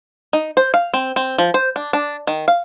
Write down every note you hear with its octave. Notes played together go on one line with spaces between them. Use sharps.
D#4
C5
F5
C4
C4
F3
C5
D4
D4
D#3
F5